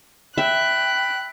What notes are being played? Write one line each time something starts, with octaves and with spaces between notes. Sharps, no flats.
E5 G5 B5 F#6